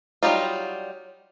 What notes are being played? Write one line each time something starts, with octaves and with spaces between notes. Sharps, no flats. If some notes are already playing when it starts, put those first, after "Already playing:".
F#3 G3 D#4 F4